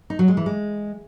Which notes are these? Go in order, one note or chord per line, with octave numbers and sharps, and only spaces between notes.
D#4
F#3
G#3
E3
G#3